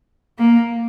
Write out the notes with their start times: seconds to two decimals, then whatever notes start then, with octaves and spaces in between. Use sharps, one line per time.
0.38 A#3